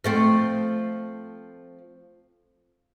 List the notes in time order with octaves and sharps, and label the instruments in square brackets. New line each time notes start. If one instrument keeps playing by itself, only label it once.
[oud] F3 A3 C4